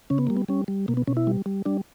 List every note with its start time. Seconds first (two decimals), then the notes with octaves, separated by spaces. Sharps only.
0.10 C#3 C#4
0.18 B3
0.27 G3 A#3
0.37 B3
0.48 G3 C#4
0.68 G3
0.88 B2 A#3
0.97 B3
1.07 B2 C#4
1.17 E4
1.27 G3
1.46 G3
1.65 G3 D4